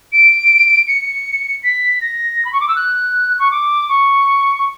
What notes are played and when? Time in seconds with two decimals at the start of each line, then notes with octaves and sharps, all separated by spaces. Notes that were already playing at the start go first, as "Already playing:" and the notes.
0.12 D7
0.88 C#7
1.63 B6
2.01 A#6
2.45 B5
2.53 C#6
2.60 D6
2.68 E6
2.76 F#6
3.39 C#6
3.51 D6
3.89 C#6
4.58 C#6